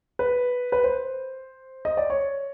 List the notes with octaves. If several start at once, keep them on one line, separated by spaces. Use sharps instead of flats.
B4
B4
C5
D#5
D5
C#5